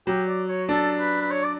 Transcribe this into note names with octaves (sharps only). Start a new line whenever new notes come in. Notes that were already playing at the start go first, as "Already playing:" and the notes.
F#3 G4
D5
C#5
D4 A4
B4
B4
C#5
D5